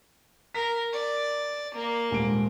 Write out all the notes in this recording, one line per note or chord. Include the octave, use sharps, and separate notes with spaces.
A#4 B6
D5
A#3
D#1 G#2 D7